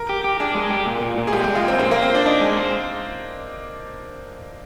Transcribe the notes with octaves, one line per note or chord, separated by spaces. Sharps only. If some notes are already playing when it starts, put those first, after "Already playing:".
Already playing: A#4
G4
G4
D4 G#4
G#3
G4
A#2
A#2
A#2
G#4
G#3 G4
G4
G#3
F4
A#2 C4
C4 C5
A#3
C5
C4
C5
D4
D4 D#4
G#3
C5